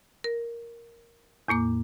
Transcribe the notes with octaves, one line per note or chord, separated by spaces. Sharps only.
A#4
E2 A2 A#3 D6